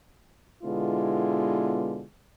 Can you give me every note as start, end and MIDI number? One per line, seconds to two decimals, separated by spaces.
0.63 2.04 47
0.63 2.04 50
0.63 2.04 56
0.63 2.04 59
0.63 2.04 64
0.63 2.04 65